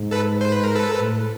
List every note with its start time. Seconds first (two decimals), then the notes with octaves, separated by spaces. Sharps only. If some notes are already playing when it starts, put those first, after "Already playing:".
Already playing: G#2
0.11 A4 B4
0.41 C5
0.52 B4
0.64 A#4
0.75 A4 B4
1.00 A2